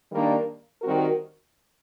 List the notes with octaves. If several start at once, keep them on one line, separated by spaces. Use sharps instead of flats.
D#3 G3 A#3 D4
D#3 G3 C4 F#4 A#4